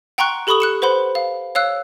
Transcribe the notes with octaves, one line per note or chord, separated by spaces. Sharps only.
F#5 G5 A#5 C6 C#6 F#6
G4 A4 B5 C#6 D#6 F#7
F#6 C#7 E7
B4 C5 F#5 B5 C6
F5
C#5 F5 E6 F#6